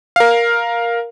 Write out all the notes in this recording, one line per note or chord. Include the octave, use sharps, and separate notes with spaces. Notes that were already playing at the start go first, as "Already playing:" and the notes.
A#4 F5